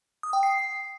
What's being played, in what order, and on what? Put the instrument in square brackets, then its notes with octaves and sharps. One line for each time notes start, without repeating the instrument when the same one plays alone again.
[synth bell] D#6
G5
C7